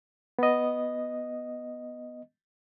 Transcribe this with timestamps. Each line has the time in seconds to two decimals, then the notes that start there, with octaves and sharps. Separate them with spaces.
0.39 B3 D#5